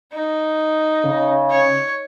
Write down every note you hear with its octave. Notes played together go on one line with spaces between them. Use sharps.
D#4
C#3
C#5